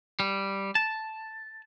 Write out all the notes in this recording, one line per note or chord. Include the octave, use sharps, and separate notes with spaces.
G3
A5